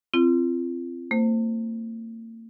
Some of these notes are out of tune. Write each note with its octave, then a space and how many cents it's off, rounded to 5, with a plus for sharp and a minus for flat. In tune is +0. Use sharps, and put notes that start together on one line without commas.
C4 +0 F4 -35
A#3 -45 C5 +0